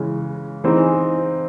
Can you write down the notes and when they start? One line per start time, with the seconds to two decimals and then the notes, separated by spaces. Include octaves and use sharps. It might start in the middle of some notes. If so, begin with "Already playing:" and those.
Already playing: C#3 E3 G#3
0.64 E3 C4 D#4 G#4